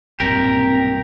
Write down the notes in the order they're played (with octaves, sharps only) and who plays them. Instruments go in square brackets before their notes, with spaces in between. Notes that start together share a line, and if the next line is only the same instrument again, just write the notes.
[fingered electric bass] B1 G2 A#2 [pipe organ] C4 [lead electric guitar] G4 A#4